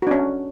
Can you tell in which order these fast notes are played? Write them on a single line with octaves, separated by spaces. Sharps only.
F#4 D4 C#4